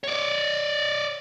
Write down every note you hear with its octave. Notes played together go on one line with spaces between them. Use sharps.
C#5 D5